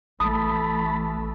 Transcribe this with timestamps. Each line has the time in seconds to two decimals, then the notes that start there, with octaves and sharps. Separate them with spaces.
0.20 A1 E3 A3 A5 B5 D#6